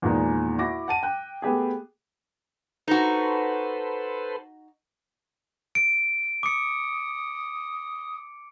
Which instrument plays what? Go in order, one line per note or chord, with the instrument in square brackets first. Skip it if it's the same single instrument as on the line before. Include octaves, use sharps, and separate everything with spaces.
[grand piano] E2 A#2 D#3 F3 G#3 D#4
E4 F#4 D6 A#6
F#5 A5 D#7
G5 F#6
A3 B3 G4 G#4
[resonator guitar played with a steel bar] D#4 F#4 [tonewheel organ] A4 B4 C5
[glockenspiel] D7
[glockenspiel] D6 C#7 [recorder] D#6